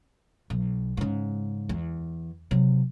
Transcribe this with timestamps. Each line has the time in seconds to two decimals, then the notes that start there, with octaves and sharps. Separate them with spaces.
0.50 B1
0.97 G#2 C#3
1.69 E2
2.51 C3 F#3